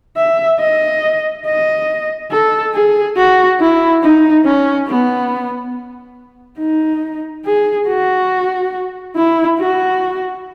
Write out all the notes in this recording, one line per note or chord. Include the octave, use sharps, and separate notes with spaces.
E5
D#5
D#5
A4
G#4
F#4
E4
D#4
C#4
B3
D#4
G#4
F#4
E4
F#4